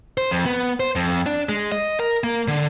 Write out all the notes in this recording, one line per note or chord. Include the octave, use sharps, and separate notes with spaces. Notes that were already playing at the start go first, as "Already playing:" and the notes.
C5
F2
B3
C5
F2
D4
G#3
D#5
A#4
A#3
D3